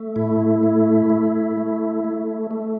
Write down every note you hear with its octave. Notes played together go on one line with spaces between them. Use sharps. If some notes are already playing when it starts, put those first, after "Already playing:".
Already playing: A3
A2 E4
A3
A3
A3
A3
A3